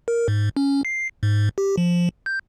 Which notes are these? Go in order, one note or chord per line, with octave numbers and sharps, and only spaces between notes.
A#4
G#2
C#4
C7
G#2
G4
F3
G6